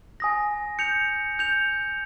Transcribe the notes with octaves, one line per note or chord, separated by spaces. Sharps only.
G#5 D#6 A#6
G6 C#7 F7
G6 C#7 F7